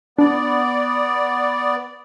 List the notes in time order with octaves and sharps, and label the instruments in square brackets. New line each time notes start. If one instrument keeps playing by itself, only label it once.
[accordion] B3 D5 [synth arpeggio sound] D4